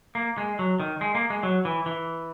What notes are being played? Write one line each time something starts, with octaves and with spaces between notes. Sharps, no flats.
A#3
G#3
F#3
D#3
G#3
A#3
G#3
F#3
E3
E3